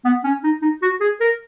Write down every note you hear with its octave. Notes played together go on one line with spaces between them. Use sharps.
B3
C#4
D#4
D#4
F#4
G#4
A#4